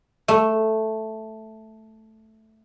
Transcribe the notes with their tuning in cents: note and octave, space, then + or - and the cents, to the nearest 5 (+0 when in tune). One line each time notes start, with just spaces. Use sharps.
A3 +0